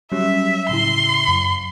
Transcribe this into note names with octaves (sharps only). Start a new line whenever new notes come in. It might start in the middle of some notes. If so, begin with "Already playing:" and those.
F#3 G3 C#4 E5
A2 C#3 E4 C6
F#2